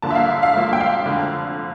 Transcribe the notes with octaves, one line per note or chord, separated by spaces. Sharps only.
G2 D3 F3 A#3 A5
E5
F5
E5
F5
G2 D3 F3 A#3 E5
G5
F5
F1 F2 D3